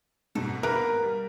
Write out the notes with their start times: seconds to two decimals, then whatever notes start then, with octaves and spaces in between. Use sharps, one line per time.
0.35 G#2 B2 A4
0.63 A#3 B3 A#4 B4
1.03 G3